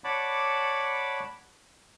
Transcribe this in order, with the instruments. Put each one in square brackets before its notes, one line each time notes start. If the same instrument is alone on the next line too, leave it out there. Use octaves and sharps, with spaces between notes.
[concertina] C#5 D5 F#5 A5 B5 D6